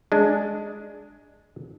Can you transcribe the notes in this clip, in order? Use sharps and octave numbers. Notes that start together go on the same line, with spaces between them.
G#3 D4